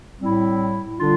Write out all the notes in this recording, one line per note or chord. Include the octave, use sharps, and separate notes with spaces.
A2 G3 C4 E4
D3 G3 D4 F4